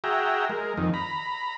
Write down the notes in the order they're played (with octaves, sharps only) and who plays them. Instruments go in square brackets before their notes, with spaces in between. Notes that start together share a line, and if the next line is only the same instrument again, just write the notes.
[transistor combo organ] F#4 G#4 E5 G5 A#5
G#3 A#4
F2 D#3
A#5 B5